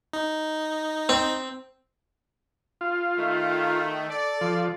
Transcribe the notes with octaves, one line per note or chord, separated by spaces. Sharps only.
D#4
C4
F4
D#3 A3
A4 D5
F3